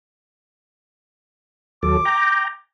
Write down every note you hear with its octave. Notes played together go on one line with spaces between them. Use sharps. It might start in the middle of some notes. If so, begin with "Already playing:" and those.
D#2 F#3 A4 D6
G5 A#5